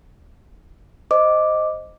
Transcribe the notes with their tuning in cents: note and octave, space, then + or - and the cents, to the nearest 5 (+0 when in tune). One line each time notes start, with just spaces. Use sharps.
C5 +0 D#5 +0 D6 +0